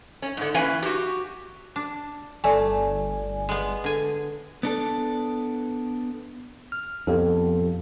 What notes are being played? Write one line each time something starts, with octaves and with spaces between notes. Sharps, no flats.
C#4
G#2 D3
E3 A#3 C#4 B4 F5 G#5
F#4 G4
D4
G1 A3 D5 G#5
G#3 B3
D3 G#5
B3 D4 A4
F6
F2 B3 G4 A4